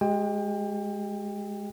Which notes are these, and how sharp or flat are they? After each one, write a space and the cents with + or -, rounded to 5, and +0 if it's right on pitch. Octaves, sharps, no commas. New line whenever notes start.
G#3 +0 G4 -35 G5 +30